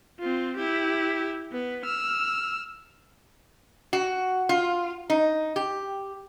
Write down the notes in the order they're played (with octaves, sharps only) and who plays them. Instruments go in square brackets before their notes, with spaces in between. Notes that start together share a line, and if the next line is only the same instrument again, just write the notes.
[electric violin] C4 F4
E4 G4
B3 B4
E6 F6
[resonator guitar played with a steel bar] F#4
F4
D#4
G4